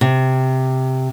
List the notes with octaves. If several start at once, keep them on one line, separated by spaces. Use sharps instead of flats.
C3